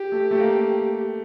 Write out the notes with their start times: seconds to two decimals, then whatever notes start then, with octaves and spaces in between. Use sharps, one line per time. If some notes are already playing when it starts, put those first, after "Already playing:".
Already playing: G4
0.12 A3
0.31 A3
0.40 A#3